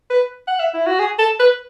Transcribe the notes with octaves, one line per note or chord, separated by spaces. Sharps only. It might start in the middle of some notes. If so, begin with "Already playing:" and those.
B4
F#5
E5
E4
F#4
G#4
A4
B4